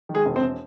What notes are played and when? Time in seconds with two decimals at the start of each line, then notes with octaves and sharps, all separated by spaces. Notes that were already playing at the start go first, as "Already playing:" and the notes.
0.09 D#3
0.14 G#3 G#4
0.26 E1
0.36 C4 C5
0.41 E1